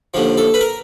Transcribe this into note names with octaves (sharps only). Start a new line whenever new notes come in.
D#2 D3 F3
A4
B4
A#4